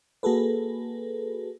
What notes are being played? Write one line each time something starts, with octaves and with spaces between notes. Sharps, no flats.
A#3 F#4 G#4 A4 B4